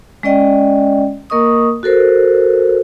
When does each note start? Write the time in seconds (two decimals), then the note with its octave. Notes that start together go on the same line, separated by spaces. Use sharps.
0.23 G#3 C#4 D5 D#5 G5
1.30 A#3 A#4 D#5 C#6 D#6
1.83 F#4 A4 A#4 C5